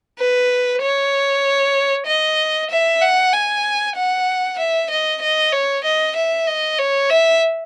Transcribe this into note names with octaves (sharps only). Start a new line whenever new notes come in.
B4
C#5
D#5
E5
F#5
G#5
F#5
E5
D#5
D#5
C#5
D#5
E5
D#5
C#5
E5